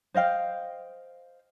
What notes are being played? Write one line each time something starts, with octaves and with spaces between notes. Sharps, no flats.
C5 D#5 F5 G5